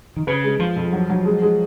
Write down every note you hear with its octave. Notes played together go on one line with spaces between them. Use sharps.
D#3
C#3 B4
G#3
F3 F4
F2
F#3
F#3
G#3
G#3